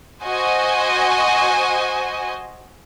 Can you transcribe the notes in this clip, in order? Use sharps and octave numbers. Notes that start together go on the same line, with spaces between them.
F#4 C5 D#5 G#5